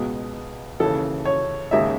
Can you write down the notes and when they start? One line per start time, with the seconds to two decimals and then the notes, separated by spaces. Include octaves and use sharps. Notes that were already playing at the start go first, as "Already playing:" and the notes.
Already playing: C#2 B2 G#3 B3
0.80 D#2 C#3 E3 A4
1.25 C#5
1.71 D#2 C#3 G#3 D#4 E5